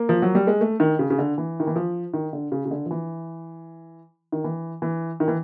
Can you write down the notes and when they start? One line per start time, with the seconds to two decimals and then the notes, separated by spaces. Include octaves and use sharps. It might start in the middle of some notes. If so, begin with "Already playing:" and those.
Already playing: A#3
0.09 F3
0.22 F#3
0.35 G3
0.47 G#3
0.61 A3
0.80 D#3
0.99 C#3
1.10 C#3
1.19 D3
1.38 E3
1.60 D#3
1.67 E3
1.76 F3
2.14 D#3
2.33 D3
2.52 C#3
2.65 C#3
2.71 D3
2.86 F3
2.91 E3
4.32 D#3
4.44 E3
4.82 E3
5.20 D#3
5.28 E3